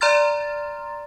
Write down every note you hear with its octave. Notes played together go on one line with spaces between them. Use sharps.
D5 A#5 C6 F6 A6